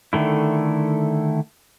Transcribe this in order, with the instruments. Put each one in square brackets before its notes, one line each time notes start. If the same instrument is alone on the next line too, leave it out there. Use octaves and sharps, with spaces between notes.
[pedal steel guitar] D3 D#3 A3 E4